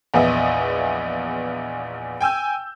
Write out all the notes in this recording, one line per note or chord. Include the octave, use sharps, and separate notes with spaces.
A#1 E2 B3 D#5 E5
G5 G#5 E6 G6